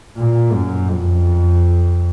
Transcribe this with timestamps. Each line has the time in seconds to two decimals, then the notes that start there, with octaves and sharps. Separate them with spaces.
0.17 A#2
0.53 F#2
0.88 F2